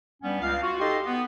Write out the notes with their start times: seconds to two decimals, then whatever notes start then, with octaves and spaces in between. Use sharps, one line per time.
0.23 G2 G3 B3 C#4
0.41 C#2 F5
0.62 F4 F#4
0.80 D#4 G4 A4 D#5 C6
1.05 B3